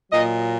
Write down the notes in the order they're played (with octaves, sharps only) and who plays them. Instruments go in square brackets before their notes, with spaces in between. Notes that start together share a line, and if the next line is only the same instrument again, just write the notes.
[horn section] A#2 F#3 D#5